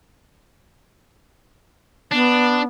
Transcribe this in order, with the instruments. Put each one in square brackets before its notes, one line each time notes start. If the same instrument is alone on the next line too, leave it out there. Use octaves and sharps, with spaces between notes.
[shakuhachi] B3 [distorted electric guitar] D4